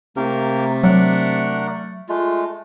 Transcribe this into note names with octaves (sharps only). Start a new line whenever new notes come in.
C3 A3 A#3 G4 A#4
F#3 D4 A#4 F#5
G#3 A3 F4